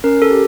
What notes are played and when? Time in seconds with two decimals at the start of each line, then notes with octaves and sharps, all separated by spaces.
0.04 C#4 A#4
0.22 A4
0.31 G4